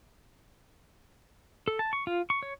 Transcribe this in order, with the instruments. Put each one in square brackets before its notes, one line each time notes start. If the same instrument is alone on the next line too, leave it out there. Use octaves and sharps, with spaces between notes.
[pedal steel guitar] A4
A5
C#6
F4
C#6
C#5